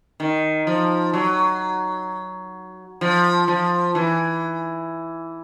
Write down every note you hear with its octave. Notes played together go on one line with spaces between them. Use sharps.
D#3
F3
F#3
F3
F3
E3